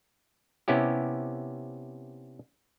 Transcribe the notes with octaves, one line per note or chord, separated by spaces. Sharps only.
C3 B3 C#4 E4 G4